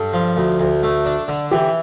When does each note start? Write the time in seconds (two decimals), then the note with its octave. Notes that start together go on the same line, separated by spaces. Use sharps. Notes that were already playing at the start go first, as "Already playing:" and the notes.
Already playing: G2 A4
0.13 F3
0.37 D2
0.60 D2
0.83 A3
1.06 D4
1.28 D3
1.51 E3 G4